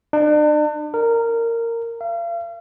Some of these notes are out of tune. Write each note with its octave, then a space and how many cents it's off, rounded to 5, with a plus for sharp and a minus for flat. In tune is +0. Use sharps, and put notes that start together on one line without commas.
D4 +40
A#4 -15
F5 -40